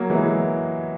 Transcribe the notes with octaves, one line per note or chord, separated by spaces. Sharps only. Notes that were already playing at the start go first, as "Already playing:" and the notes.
Already playing: F#3 A#3
E3 G#3